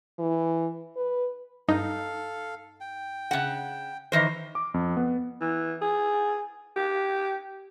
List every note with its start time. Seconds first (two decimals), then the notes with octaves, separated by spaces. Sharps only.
0.19 E3
0.97 B4
1.68 G2 D#4 A4 F5
2.81 G5
3.31 C#3 F#5
4.12 D#3 E3 C5
4.55 D6
4.74 F2
4.97 B3
5.41 E3
5.81 G#4
6.76 G4